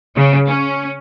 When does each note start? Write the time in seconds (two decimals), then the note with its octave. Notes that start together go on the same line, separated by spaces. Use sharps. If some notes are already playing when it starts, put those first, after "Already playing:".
0.15 C#3
0.47 C#4